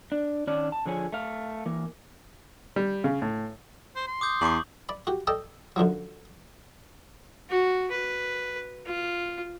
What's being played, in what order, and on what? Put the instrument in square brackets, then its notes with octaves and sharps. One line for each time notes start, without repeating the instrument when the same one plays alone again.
[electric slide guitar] D4
D#3 C#4 D4 D5
A5
D3 F3 G#4 C#5 G#5
A3 F5
E3 A#3
[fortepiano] G3
C#3
A2
[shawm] C5
C6
[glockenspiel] D6 D#6 G6
[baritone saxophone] E2 [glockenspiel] C#6 F#7
[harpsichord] D5 B5
F#4 G4
A4 D5 D#5 G5 A5
F#2 D3 F3 F#3
[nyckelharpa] F#4
B4
F4